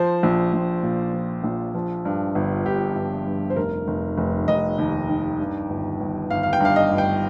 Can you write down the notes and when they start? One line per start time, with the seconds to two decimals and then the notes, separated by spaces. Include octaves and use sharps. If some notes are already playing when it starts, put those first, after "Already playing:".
Already playing: F3 C5
0.23 A#1
0.53 A#1
0.83 A#2
1.13 F3
1.44 A#1
1.75 F3
2.05 G2
2.35 G1
2.65 G1 G4
2.96 G1
3.26 G2
3.50 C5
3.56 F1 A#4
3.88 F1
4.18 F1
4.48 F1 D#5
4.78 D#2
5.09 D#3
5.40 G2
5.70 G1
6.00 G1
6.30 G1 F5
6.43 F5
6.53 G5
6.60 G2 F5
6.76 D#5
6.91 G1
6.98 G5